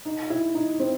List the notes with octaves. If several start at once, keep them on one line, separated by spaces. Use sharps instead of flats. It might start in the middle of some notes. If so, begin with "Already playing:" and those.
D#4
E4
D#4
C4